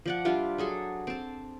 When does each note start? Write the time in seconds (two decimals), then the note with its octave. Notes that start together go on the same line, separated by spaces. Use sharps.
0.06 F3 D5 F#5
0.25 G3 D4 F4 E5
0.58 F#3 G#4 A4
1.07 C4 A5